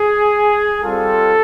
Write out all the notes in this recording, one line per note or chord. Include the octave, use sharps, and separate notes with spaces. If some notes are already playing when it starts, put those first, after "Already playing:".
Already playing: G#4
G3 C4 F4 A4